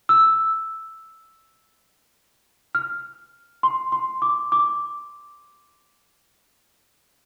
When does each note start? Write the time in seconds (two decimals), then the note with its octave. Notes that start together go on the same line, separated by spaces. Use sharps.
0.09 E6
2.75 F6
3.63 C6
3.92 C6
4.22 D6
4.52 D6